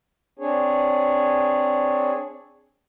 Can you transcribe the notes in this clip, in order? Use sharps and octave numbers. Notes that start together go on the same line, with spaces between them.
C4 D4 G#4 C#5